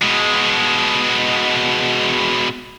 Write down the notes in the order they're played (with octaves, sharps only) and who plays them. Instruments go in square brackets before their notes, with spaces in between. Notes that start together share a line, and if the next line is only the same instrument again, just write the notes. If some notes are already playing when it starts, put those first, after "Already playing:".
[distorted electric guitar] B2 G#3